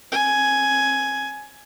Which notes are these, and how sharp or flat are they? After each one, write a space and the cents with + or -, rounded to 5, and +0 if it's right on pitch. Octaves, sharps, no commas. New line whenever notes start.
C4 +35 G#5 +10